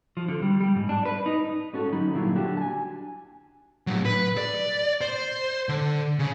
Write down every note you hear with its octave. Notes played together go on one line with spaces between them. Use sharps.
F3
D3
G3
G3
G#2
D4
B4
D#4
G#2 C#4 F#4 A4
D2 F#3 D#4 B5
G2 A#2 D3 F#3 E4 F4
D3 D4 F#4 G4
G#5 A5
A2 F#3
B4
D5
C5
D3
C#3